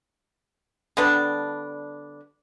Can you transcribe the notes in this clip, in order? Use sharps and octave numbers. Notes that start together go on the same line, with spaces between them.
D3 G3 B3 D4